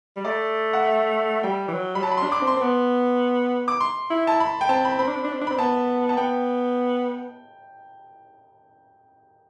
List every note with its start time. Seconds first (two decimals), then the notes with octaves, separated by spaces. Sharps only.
0.17 G3
0.25 A3 D5
0.73 F#5
0.84 E5
1.43 G3 G5
1.68 E3
1.73 F#3
1.95 G3 B5
2.03 F#3 A5
2.12 B5
2.18 C6
2.23 D4
2.32 D6
2.42 C4
2.47 C6
2.57 C4
2.61 B3
3.68 D6
3.81 C6
4.10 E4
4.27 A5
4.40 B5
4.61 G5
4.69 C4 A5
4.85 B5
4.99 C4 B5
5.07 D4
5.16 C4
5.24 D4
5.33 C4
5.41 D4
5.47 C4 B5
5.58 B3 A5
6.09 A5
6.17 B3 G5